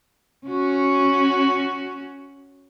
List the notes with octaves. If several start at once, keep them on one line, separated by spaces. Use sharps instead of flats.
C#4 F#4